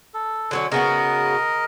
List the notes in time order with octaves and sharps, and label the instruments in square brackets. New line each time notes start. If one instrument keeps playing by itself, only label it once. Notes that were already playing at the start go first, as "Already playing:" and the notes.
[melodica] A4
[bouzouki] D3 F#3 C#4
[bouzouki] C#3 B3 F#4 [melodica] A#4 D#5